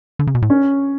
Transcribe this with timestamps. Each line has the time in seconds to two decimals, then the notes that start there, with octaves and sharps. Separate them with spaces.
0.19 D3
0.27 C#3
0.35 B2
0.42 A2
0.50 C#4